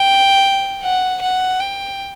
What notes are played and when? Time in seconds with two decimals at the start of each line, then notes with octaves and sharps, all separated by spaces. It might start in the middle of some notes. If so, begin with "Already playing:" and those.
Already playing: G5
0.83 F#5
1.22 F#5
1.60 G5